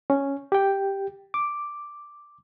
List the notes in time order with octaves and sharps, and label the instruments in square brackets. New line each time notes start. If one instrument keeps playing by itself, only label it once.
[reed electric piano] C#4
G4 G5
D6